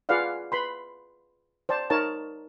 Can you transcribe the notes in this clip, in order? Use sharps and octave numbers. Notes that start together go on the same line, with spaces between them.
F4 G#4 B4 D5 F5 F#5
B4 B5 C6
C5 D5 A5
D#4 A#4 C#5 A5